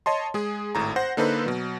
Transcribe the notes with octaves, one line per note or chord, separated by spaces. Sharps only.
C#5 D#5 A5 C6
G#3 G#4
G#1 A2 A#5
C5 F#5 A#6
D3 A#3 D#4 A4 B4 C5
B2 F#3